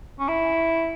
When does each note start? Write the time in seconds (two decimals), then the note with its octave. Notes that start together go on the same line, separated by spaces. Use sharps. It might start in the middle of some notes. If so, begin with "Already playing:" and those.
0.19 C#4
0.28 E4